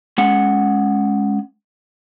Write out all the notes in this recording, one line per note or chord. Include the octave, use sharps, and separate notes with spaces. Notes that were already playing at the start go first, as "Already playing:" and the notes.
G#3 C#4 F#5